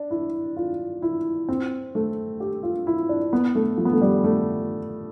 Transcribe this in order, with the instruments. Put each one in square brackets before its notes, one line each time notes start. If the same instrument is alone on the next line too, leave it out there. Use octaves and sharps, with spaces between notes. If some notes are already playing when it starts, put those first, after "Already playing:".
Already playing: [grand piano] D4
E4
F4
E4
C4
A3
G4
F4
E4
D4
B3
A3
F3
B3
A3
G3
A3